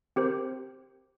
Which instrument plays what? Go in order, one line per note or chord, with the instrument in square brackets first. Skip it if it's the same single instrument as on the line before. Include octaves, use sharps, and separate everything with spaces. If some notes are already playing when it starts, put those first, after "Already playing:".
[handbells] C4 G4 A#4 C5